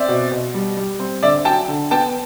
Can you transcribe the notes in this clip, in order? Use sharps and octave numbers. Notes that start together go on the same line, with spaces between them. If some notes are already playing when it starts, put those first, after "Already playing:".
Already playing: C4 D5 E5
B2
B2
G3
G3
C4
D3 D5 E5
F#3 G5 A5
D3
B3 G5 A5